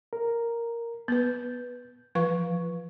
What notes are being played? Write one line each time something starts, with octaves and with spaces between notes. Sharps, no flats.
A#4
B3 B4 G6
E3 F3 B4 F5 C#6